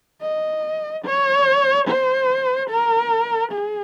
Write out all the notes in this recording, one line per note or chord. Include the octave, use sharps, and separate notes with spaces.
D#5
C#5
C5
A#4
G#4